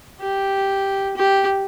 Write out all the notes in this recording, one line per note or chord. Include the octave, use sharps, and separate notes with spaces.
G4
G4